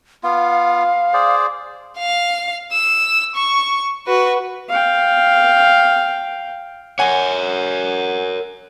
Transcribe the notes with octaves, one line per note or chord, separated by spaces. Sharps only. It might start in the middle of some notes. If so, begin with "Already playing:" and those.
B3 F4 F5
G#4 C5 D5
F5
E6
C#6
F#4 B4
F5 G5
A#4 C#5 F#5 G#5